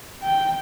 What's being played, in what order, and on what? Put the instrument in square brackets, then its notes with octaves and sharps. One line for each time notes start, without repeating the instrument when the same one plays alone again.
[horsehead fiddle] G5